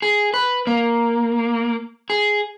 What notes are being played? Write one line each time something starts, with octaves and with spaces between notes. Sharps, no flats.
G#4
B4
A#3
G#4